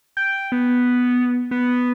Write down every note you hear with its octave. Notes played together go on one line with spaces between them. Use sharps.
G5
B3
B3